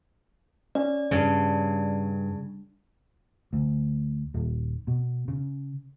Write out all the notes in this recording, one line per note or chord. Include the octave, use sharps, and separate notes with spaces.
C#4 D5
G2 C#3 C#4
D2
D#1
B2
C#3